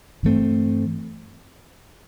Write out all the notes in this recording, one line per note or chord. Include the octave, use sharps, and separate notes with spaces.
G2 E3 A3 C4